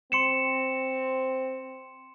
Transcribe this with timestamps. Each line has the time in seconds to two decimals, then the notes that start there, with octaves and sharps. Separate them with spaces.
0.12 C4 C6 C#7 E7